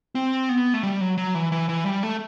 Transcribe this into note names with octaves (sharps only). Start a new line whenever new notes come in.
C4
B3
A3
G3
F#3
F#3
E3
E3
E3
G3
A3